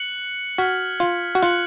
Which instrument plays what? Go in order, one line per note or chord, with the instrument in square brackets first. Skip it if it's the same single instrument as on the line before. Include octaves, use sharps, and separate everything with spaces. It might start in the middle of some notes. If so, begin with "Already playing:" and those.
Already playing: [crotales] F#6 C#7 F#7
[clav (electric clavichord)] F#4 [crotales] F6 G#6 B6
[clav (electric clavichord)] F4
F#4
[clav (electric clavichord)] F4 [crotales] F#6 C#7 F#7